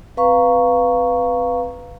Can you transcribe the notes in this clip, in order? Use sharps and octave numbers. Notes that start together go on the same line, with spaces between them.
C4 B4 F5 A#5 C#6